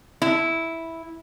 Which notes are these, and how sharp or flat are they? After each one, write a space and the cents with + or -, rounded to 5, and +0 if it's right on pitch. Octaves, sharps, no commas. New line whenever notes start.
E4 -5